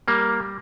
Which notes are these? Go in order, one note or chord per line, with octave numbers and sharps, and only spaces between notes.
G3 A#3